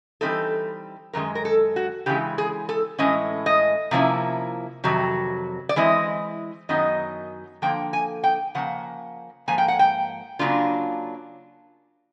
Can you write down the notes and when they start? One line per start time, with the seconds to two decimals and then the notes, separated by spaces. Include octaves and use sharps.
0.21 E3 G3 C4 D#4 A4
1.13 F#2 D#3 G#3 A#4
1.35 A#4
1.45 A4
1.76 F#4
2.06 C#3 E3 G#3 G4
2.38 G#4
2.69 A4
2.99 A2 E3 G#3 C#4 D#5
3.46 D#5
3.91 C3 F3 A#3 C#4 E4
4.84 F2 C3 D#3 F#3
5.69 D5
5.76 E3 G#3 C4 E4 D#5
6.69 F#2 D#3 F#3 B3 D#4 D#5
7.62 D3 F3 A#3 G5
7.93 G#5
8.24 G5
8.55 C#3 F3 A#3 F#5
9.48 G#2 F3 A#3 G#5
9.58 G5
9.68 F#5
9.79 G5
10.39 C#3 F#3 A#3 D4 F4